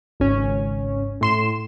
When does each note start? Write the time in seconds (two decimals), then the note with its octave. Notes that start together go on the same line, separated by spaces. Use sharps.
0.20 G#1 C#2 C#4
1.21 A2 C6 E7